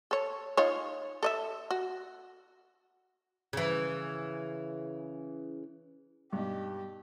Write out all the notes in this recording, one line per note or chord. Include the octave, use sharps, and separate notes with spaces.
A4 C#5
D#4 F4 C#5
A4 D#5 E5
F#4
C#3 E3
G2 B2 D#4 G4